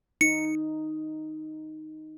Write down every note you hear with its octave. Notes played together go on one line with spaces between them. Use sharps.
D#4 C#7